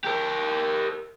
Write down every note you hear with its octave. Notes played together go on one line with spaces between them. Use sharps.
G4 A#4